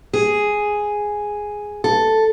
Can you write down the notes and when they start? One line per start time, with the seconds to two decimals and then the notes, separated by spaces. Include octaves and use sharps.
0.13 G#4
1.84 A4